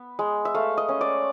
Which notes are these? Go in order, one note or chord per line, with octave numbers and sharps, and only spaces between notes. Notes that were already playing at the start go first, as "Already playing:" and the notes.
Already playing: B3
G#3
E5
A3 F5
D#5
C#4
D5